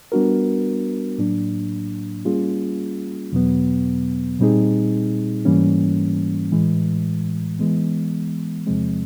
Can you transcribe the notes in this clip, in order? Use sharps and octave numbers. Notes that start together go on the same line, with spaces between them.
G3 B3 D4 F#4 A#4
A2 F#3 A#3 D4
G3 A#3 C#4 F4 G#4
E2 B2 F#3 B3
A#2 G3 C4 D#4 G#4
G#2 E3 G3 A#3 C#4
A2 E3 G#3
E3 G#3 B3
E2 C3 F3 G#3 C4